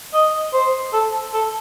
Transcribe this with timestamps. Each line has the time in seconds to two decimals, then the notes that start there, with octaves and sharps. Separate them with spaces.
0.14 D#5
0.53 C5
0.93 A4
1.34 A4